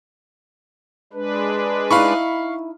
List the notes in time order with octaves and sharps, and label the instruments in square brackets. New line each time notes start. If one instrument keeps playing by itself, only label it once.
[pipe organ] G#3 D4 B4
[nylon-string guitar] D#4 E4 [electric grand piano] F5 B5 C#6